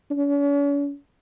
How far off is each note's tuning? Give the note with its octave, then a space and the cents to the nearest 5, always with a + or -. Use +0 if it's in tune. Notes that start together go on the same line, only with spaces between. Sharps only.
C#4 +45